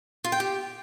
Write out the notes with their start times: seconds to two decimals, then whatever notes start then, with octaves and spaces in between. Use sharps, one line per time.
0.24 F4
0.32 G5
0.40 G4